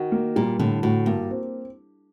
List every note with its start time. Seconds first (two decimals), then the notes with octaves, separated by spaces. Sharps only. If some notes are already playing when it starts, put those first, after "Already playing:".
Already playing: D#3 F#4
0.12 A#3
0.36 A#2 G3
0.59 A2 D3
0.83 A2 F#4
1.06 G2 A#3
1.31 C4